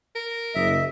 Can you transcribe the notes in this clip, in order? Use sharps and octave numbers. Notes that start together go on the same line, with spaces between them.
A#4
F#1 D#5 E5